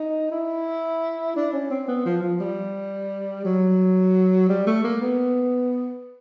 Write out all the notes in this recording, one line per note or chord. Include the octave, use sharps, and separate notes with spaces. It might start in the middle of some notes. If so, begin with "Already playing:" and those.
Already playing: D#4
E4
D4
C#4
C4
B3
F3
F3
G3
F#3
G3
A3
A#3
B3